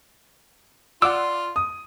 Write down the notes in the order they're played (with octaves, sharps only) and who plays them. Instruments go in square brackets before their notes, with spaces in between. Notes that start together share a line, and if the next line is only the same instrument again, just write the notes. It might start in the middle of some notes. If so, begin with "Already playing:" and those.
[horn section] F4 [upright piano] D5 [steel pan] F#5 D6 [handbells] E6
[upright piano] D#6